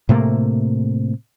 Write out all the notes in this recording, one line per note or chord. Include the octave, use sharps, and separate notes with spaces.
A2 C3 A3 A#3